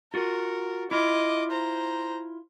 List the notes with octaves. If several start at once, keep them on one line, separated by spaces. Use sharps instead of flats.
F4 F#4 A#4
E4 F4 D#5 D6
C5 A#5